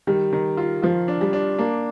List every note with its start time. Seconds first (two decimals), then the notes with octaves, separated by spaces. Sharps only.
0.07 D#3 G3
0.33 D#3
0.57 F4
0.82 F3 F4
1.08 D4
1.21 G3
1.33 D4
1.59 A#3 D4